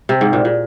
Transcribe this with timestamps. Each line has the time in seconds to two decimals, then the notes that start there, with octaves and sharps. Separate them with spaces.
0.09 C3
0.21 G#2
0.33 A#2
0.45 A#2